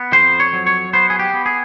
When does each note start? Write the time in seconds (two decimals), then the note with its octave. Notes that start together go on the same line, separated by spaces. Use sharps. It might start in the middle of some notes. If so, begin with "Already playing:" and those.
Already playing: B3
0.12 F2 C5
0.40 C#5
0.53 F#3
0.67 C#5
0.93 B3 C5
1.10 G#4
1.19 G4
1.33 B3
1.46 G#4